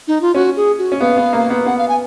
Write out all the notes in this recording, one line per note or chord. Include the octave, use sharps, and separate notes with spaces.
D#4
F4
C#4 F#4
G#4
F#4
C#4
B3 F5
B3
A#3
B3
B3 F#5
F5
G#5